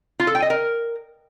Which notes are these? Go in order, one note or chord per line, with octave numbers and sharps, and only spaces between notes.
F4
A4
G5
D#5
A#4